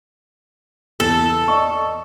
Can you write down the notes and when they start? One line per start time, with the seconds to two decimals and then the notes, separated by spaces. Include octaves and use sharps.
1.00 E2 A4
1.48 D5 D#5 C#6